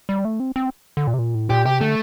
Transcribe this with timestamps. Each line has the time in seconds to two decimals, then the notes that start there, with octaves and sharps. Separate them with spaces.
0.09 G3
0.25 A3
0.40 C4
0.56 C4
0.97 D3
1.07 A#2
1.13 C3
1.19 A#2
1.34 A2
1.50 A#2 G4
1.66 C3 G4
1.81 D3 A3